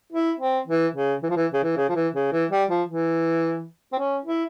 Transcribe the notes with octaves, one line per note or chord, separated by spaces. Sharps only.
E4
C4
E3
C#3
E3
F3
E3
C#3
E3
C#3
F3
E3
C#3
E3
G3
F3
E3
C4
C#4
E4